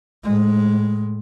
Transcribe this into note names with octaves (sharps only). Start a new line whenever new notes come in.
A2 G#3